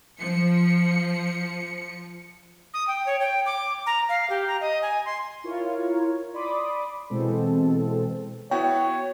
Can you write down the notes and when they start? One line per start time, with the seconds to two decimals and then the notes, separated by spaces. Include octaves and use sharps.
0.19 F3 C#7
2.74 D#6
2.88 G5
3.06 C#5
3.21 G5
3.46 D6
3.86 A#5
4.09 F5
4.30 G4
4.47 A#5
4.61 D#5
4.82 G#5
5.06 C6
5.44 E4 F4 A#4 C#5
6.34 D5 B5 C6 D6 D#6
7.10 B2 E3 G#3 C4 A4
8.51 B3 E4 F#4 C#5 G5